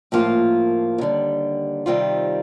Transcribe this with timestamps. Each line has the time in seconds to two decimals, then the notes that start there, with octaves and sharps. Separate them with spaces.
0.12 A2 F3 A#3 F4
0.98 D#2 D3 G3
1.86 C3 D#3 G3 C4 F4